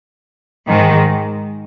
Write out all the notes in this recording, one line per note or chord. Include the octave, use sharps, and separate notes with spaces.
G#2 D#3 G#3